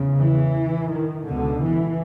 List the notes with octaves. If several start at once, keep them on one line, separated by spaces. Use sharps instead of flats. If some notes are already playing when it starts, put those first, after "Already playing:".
Already playing: E2 C#3
E3
D#3
C#2 B2 D3
E3